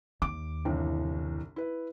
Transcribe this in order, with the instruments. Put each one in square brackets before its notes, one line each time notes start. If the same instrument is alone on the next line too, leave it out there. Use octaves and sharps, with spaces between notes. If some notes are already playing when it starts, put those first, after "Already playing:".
[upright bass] D#2 [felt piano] D6
[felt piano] G1 C2 E3
E4 B4